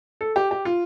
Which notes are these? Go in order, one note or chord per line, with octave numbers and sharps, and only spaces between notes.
A4
G4
G4
F4